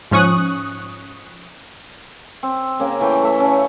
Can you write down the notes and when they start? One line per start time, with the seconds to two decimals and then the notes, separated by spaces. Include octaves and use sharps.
0.11 G#2 F3 C#4 C#6 D#6 F#6
2.43 C4
2.79 C#3 A#3 A#4
3.01 E3 A3 B4 G5
3.22 A3 E5
3.40 C#4 F5